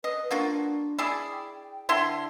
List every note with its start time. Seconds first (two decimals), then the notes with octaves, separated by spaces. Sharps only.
0.04 B4 D#5
0.31 A#3 D4 F4 F#4
0.98 E4 G#4 D5
1.32 G5
1.89 D3 E4 C6